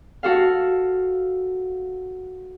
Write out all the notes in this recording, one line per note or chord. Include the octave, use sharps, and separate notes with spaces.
F#4 A4 F5